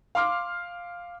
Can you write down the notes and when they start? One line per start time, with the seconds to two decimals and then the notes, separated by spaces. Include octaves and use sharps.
0.15 F5 C6 D6 F6